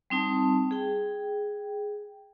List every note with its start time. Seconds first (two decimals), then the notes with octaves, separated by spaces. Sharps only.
0.10 G3 C4 D#4 A5
0.71 G#4 G5